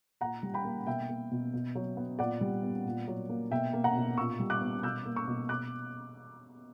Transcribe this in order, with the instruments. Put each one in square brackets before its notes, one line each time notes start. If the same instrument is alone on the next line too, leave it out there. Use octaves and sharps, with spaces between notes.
[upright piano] A#2 F#5 A#5
G3
G5 B5
A#3
B2 E5 G5
A#3
B2
B2
F#3
B3
A#2 D5 F#5
G3
B3
A#2
F#3
A#3
B2 E5 G5
A#3
F#5 A#5
B2
A#2 C#6 E6
G3
D6 F#6
B3
B2 E6 G6
A#3
C#6 E6
B2
B2 D6 F#6